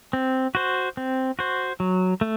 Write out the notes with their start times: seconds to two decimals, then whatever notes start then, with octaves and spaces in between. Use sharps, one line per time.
0.13 C4
0.55 F#4 C5
0.97 C4
1.39 F#4 C5
1.80 F#3
2.21 A3